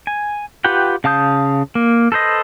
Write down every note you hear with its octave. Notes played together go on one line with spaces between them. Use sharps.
G#5
F4 G4 B4 F#5 G5
C#3 F5 A5 D#6 G6
A#3
A4 B4 C5 D#5